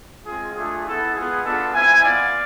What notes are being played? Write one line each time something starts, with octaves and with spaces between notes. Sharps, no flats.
G#3 C4 F4 G#4
A3 D4 F4 G#4
B3 E4 A4
G#3 B3 F4 G#4
B3 D4 F4 A4
G#3 C4 E4 E5 G#5
B3 F4 D5 F5